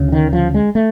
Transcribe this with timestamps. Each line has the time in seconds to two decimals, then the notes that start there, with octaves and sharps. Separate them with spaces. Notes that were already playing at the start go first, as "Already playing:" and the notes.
Already playing: D2 C#3
0.08 E3
0.12 D#3
0.33 F3
0.54 G#3
0.75 A3